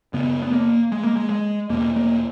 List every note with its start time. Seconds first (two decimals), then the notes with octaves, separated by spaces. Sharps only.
0.13 F#2 C#3 B3
0.42 B3
0.53 A#3
0.92 G#3
1.04 A#3
1.17 G#3
1.30 G#3
1.69 E2 B2 A#3
1.96 A#3